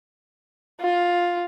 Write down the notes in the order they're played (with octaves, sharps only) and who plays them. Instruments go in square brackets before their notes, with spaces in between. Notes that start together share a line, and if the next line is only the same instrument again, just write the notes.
[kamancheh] F4